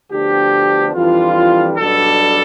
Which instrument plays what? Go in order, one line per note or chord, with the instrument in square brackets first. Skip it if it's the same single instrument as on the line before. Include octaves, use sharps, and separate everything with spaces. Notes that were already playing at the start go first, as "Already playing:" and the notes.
[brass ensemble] D2 D3 F3 B3 D4 G4
F2 E3 G3 D4 F4
B1 B2 G3 D4 A4